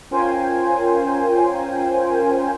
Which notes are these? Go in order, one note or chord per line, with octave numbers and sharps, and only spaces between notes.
C#4 F4 A#4 C5 G5 G#5